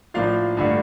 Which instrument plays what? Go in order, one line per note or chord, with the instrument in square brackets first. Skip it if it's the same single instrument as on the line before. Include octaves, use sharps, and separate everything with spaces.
[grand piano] A2 F3 A#3 D4 F4 F5
G2 D3 A3